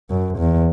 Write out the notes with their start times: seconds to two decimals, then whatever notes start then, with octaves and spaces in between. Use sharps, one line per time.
0.10 F#2
0.38 E2